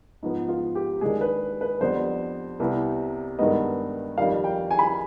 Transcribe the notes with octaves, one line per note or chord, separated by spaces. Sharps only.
G#2 F3 B3
F4
G4
D#2 D3 G#3 G#4
B4
B4
F2 D3 G3 B3 C5
C2 C3 G3 B3
G2 D#3 G#3 B3 D#5
F2 D#3 G3 F5
G5
G#5
B5
G#5